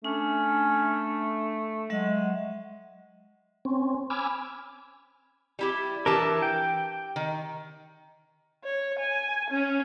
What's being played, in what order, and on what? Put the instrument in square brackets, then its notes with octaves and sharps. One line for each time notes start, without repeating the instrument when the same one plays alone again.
[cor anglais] A3 [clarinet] C#4 [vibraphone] D4
[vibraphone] F#3 E5 F#5 [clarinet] G#3
[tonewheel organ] C4 C#4
G#5 B5 D6 E6 F6
[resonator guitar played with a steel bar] G3 E4 G4
[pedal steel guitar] E3 A#4 [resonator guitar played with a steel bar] D4 G4 A5
[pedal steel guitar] G5
[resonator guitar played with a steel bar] D#3
[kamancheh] C#5
G#5
C#4